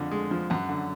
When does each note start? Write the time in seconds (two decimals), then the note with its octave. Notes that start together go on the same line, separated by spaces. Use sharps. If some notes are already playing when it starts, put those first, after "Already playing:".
Already playing: F2 D3 F3
0.11 G#3
0.31 F3
0.50 F#2 F#5
0.69 D3